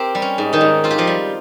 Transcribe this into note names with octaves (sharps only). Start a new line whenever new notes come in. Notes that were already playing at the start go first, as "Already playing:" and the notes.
Already playing: C4 G4 A#4
G3
C#4
G#2
D#3 D#4
G#2
C4 F4
G4
F3 F4
G3